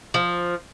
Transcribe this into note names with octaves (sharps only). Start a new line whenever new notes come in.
F3